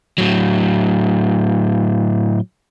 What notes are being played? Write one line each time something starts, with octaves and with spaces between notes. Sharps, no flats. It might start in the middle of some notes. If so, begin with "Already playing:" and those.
A2 F#3